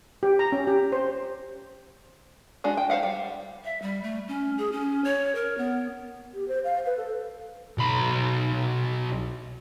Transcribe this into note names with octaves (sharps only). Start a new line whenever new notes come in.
G4
A#5
C#4
G4
C5
G#3 D4 F#4
G5
C5 D5 F5 F#5
G3
E5
G3
A3
C#4
G#4
C#4
C#5
A#4
B3
G4
C5
F5
B4
A4
B1 B5